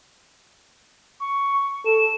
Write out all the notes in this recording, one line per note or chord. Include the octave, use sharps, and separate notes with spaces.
C#6
A4 E7